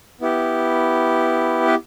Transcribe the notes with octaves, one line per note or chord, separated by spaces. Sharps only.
B3 E4 G4
B4